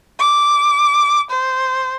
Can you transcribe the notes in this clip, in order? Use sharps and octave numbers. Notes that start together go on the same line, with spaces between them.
D6
C5